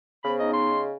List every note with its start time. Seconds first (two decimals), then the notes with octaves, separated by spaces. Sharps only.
0.25 C#3 B3 C5 B5
0.39 B3 D#4 D#5 A#5
0.53 C6
0.70 D#5